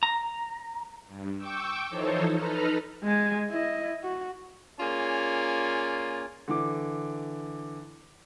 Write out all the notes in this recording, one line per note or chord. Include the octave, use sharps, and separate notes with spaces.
A#5
G2
G5 C#6 D6 E6 G6
E3 F3 D#4 A4 C5 C#5
D#4 A4 B4 A#5 F6
G#3 G#5
E4 D#5
F#4
A#3 C#4 F4 G#4 D5 G#5
D3 E3 D6